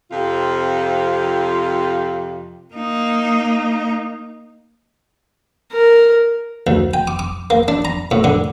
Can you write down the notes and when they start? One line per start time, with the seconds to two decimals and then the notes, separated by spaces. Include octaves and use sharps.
0.11 F2 C3 F3 F4
2.74 A#3 D#4
5.72 A#4
6.67 D2
6.94 G5
7.08 D6
7.19 D6
7.50 A#3
7.68 D4
7.85 A#5
8.11 A2
8.24 D3